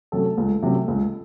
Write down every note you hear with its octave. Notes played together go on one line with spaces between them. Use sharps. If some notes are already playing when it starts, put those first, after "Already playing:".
C3 F#3 A3 C#4 A4
C#2
C3 F#3 A3 C#4
C#2